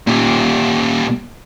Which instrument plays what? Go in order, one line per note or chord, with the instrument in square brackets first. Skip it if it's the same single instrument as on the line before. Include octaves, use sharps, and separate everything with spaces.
[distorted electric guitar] A#2 G4